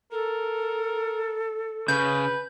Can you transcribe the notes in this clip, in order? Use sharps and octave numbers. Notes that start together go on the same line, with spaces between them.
A4 A#4
C#3 B4 G6